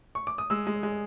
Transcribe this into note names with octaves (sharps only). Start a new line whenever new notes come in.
C#6
D6
D#6
G#3 E6
G#3
G#3